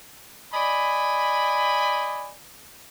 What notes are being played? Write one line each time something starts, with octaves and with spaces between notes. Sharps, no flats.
D5 D#5 G#5 B5